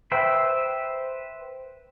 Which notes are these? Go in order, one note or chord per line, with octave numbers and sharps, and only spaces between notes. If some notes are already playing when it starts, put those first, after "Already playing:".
B4 C5 E5 G5